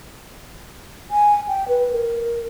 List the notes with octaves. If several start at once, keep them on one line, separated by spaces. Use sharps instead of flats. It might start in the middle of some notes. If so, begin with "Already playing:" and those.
G#5
G5
B4
A#4